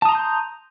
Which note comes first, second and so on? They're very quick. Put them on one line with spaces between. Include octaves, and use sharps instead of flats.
A5 D#6 A#5 C6 G6